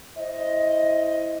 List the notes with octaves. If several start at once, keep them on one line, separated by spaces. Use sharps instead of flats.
E4 C5 D#5